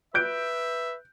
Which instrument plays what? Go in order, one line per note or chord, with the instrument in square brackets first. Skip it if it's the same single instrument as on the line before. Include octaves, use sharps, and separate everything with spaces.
[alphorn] B4 [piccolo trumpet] E5 [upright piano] F#6 G6 D7